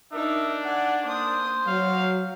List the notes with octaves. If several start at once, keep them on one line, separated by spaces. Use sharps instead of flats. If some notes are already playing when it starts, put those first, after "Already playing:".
D4 D#4 A#4 E5
D5 F#5 G#5
A#3 C5 D#6
F#3 F#4 F5